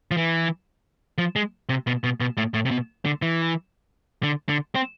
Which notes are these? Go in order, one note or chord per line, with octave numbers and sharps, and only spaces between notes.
F3
E3
F3
G#3
C3
B2
B2
B2
A2
A2
C3
B2
D3
E3
D3
D3
C4